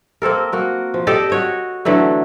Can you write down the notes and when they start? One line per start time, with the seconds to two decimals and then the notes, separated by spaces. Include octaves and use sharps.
0.22 A#3 C4 A4 A#4
0.52 A#3 F#4 A#4
0.94 F3
1.07 G4 A4 D5 D#5
1.30 F#4 C#5 D#5
1.85 D3 E3 F#3 A3